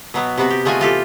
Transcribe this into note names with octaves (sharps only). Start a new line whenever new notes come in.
B2 F#3 B3
C3 B3 F#4
G4
G#3 A3 F4 F#4 G#5
E3 F4 G4 A4